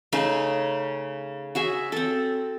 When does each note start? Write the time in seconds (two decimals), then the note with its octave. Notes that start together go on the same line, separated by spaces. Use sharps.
0.13 C#3 A3 D#4
1.55 F#4 G#4 E5
1.92 C4 A4